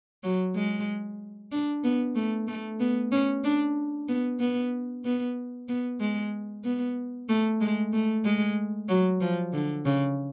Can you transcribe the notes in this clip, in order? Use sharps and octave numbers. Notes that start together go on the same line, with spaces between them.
F#3
G#3
D4
B3
A3
A3
B3
C#4
D4
B3
B3
B3
B3
G#3
B3
A3
G#3
A3
G#3
F#3
F3
D3
C#3